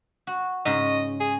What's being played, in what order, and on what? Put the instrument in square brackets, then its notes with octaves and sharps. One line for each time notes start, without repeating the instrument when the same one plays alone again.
[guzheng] F#4
[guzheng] G#2 C#3 [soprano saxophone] D#5
[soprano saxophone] G#4